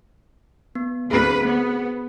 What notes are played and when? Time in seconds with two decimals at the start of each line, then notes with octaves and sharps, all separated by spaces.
0.75 B3
1.11 D2 C4 G#4 B4
1.46 B3